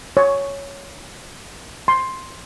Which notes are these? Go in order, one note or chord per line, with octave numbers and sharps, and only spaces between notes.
C#5
C6